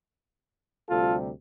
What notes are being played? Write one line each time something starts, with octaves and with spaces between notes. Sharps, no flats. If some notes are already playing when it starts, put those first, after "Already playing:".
D2 C3 G3 F4 A4